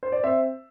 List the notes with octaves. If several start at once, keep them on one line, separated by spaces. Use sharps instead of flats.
C5
D5
C4 C5 E5